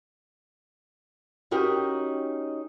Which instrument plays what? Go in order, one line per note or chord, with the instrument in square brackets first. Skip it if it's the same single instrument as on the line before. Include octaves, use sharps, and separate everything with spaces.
[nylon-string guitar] C#4 D#4 F#4 G4 A#4